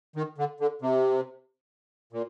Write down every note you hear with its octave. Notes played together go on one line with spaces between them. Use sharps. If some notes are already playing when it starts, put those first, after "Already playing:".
D#3
D3
D3
C3
A#2